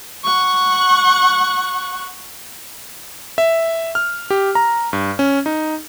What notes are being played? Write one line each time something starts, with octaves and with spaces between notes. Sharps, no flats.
F#5 C#6
E5
F6
G4
A#5
G2
C#4
D#4